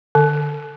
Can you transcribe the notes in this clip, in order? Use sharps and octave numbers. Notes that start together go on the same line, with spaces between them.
D3